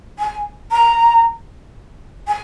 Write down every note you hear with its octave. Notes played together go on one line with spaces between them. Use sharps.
G#5
A#5
G#5